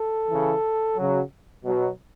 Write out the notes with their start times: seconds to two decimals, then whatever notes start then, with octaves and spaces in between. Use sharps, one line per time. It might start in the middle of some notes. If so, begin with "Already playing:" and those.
Already playing: A4
0.29 C#3 E3
0.97 C#3 F#3
1.64 B2 F#3